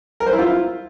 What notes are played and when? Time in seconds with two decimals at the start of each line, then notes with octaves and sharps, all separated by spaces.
0.20 A#4
0.27 C5
0.33 E4
0.39 F4